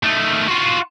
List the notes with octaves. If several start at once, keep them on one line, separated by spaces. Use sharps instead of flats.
D#3 A3
F4 F#4